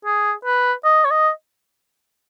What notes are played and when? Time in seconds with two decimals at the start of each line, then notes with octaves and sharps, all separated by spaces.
0.05 G#4
0.45 B4
0.85 D#5
1.05 C#5
1.11 D#5